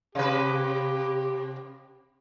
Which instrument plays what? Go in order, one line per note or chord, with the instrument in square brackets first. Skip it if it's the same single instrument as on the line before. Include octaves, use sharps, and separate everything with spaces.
[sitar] C3 B4 [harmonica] G4